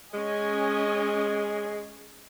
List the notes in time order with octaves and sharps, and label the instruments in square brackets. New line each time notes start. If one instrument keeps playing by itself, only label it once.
[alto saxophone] G#3 [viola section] C#4 D#5 G#5